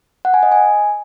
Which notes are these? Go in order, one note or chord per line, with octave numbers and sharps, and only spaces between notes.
F#5
G#5
D#5
G#5